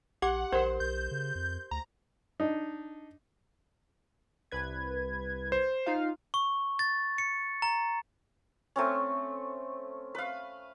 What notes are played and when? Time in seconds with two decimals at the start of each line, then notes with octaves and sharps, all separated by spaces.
0.22 A#1 G4 F#5 D6
0.52 A#1 G4 A#4 C5
0.80 B1 G6
1.11 C#3
1.35 F2
1.71 D2 A#5
2.40 D4 D#4
4.52 C2 B4 G#6
5.52 C5
5.86 D#4 F4 F5
6.34 C#6
6.79 A6
7.18 C#7
7.62 A#5
8.76 A3 C4 C#4
10.15 B4 F5